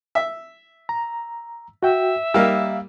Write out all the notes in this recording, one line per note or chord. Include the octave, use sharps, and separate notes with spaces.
E5
A#5
F#4 E5 G5
G3 A#3 D#4 F5 E6